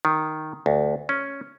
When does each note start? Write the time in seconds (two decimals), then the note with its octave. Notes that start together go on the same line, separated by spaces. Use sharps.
0.05 D#3
0.66 D2
1.09 C#4